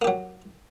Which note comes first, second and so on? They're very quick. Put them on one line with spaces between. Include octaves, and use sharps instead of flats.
A#3 G4 F#3